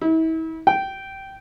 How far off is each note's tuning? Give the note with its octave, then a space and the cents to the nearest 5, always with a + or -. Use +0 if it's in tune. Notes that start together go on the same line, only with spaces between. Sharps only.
E4 -40
G5 -15